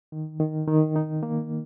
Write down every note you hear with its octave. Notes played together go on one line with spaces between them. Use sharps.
D#3
D#3
D#3
D#4
A#3